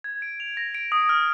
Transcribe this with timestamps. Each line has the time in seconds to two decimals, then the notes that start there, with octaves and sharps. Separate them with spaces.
0.04 G#6
0.22 D7
0.40 F7
0.57 A#6
0.75 D7
0.92 D#6
1.09 F6